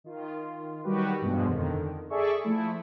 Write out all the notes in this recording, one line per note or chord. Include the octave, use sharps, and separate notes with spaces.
D#3 F4
D#3 F#3 G3 F#4 G4 B4
E2 G2 B2 F3 G#3
F2 D3 D#3
G#4 A4 D5 E5 C#6
F3 A3 E4